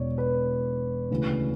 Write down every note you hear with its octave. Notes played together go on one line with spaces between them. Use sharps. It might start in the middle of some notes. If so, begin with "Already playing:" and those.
Already playing: E1 E2 B2 C#5 D5
B4
D2 C#3 E3